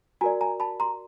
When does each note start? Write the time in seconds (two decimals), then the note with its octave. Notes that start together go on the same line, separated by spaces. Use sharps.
0.21 F#4 A#4 D5 G#5 A#5
0.41 G#5 A#5
0.60 A5 B5
0.80 A#5 C6